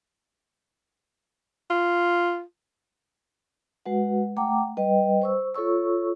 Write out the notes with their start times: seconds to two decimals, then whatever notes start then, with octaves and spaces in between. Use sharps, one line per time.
1.70 F4
3.86 G#3 F#4 B4 F#5
4.37 A3 F#5 G5 A#5 D6
4.77 G3 B4 D#5 G5
5.22 C5 C#6 E6
5.55 F4 A4 C#5 C#6 E6